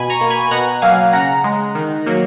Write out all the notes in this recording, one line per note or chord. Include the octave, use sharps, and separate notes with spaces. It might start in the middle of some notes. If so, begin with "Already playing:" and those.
Already playing: B2 G#5 B5
A#5 C#6
A#3
G#5 B5
G#5
B2 F#5 A#5
F#3 A#3 F5 G#5
C#3 F#5 A#5
G#3
D#3
F#3 A#3